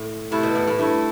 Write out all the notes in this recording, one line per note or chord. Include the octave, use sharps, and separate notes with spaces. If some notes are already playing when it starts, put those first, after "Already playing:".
Already playing: A2
C3 A3 E4 A4
B2
A2
A2
G2 A3 E4 A4